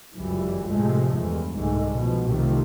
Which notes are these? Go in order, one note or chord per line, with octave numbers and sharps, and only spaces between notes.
G1 C#2 F#2 E3 G3
A2 C3 F3 G#3 A3
E2 G2
C2 G#2 D3 G#3 A3
B2 F3
C2 C3 D#3 F3 A3